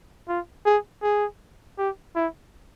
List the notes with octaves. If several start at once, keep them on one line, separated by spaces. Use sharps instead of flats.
F4
G#4
G#4
G4
E4